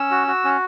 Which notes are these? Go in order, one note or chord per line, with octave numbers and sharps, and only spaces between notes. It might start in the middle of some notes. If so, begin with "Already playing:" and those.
Already playing: C#4 E6
F#4
F#4
C#4